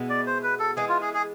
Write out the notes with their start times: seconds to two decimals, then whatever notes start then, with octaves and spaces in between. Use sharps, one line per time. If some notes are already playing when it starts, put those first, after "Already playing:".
Already playing: B2 G#3 B3 E4
0.09 D5
0.27 C5
0.43 B4
0.59 A4
0.77 E3 G#3 B3 G#4
0.89 F4
1.01 G#4
1.14 G#4